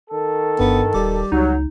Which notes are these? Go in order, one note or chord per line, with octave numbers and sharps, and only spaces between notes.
D#3 A4
G1 G2 B3
D#1 G3 D6
C#2 F#3 D#4